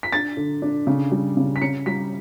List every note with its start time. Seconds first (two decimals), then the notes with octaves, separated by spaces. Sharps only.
0.03 B6
0.12 D4 A6
0.37 D3
0.62 D4
0.87 C#3
1.12 G3
1.37 C#3
1.56 B6
1.61 C#4 C#7
1.86 G3 B6